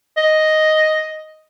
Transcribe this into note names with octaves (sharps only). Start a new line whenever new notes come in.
D#5